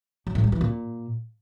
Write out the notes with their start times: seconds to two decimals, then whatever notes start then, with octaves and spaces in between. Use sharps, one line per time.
0.27 F#3
0.35 A2
0.44 G3
0.52 E3
0.61 A#2